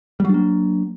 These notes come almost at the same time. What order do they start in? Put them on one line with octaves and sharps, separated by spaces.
G3 F#3 D4 A#3